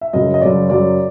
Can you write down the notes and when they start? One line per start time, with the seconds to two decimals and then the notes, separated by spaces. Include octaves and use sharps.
0.01 E5
0.13 F#2 C#3 F#3 D#5
0.34 D#5
0.41 F#2 C#3 F#3 D5
0.70 F#2 C#3 F#3 D5